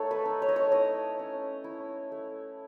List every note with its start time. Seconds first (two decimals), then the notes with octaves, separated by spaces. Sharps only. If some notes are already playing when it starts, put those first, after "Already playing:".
Already playing: A3 D#4 A4 C#5
0.11 B4
0.25 D#4
0.42 C#5
0.48 D#5
0.56 C#5
0.72 E4 D#5
1.19 C#4
1.64 E4
2.12 A3